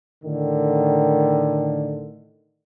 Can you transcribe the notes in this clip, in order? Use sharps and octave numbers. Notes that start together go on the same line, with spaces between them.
A2 D3 D#3